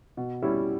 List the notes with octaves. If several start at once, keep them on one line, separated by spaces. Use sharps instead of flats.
B2
G3 C#4 E4